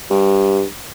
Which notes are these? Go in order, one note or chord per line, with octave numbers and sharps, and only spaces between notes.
G2